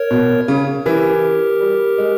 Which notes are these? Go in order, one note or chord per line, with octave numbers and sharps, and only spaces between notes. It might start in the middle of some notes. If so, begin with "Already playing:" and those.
Already playing: A#4 C#5
B2
C#3
E3 G4 A#4
G3
G#3